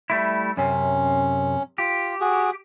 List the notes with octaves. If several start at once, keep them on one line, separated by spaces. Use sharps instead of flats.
G3 A3 E4
F#2 C3 C#4
F4 G4
F#4 G#4